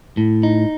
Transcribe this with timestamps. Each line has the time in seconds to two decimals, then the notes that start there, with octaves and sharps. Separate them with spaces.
0.17 A2
0.43 D#4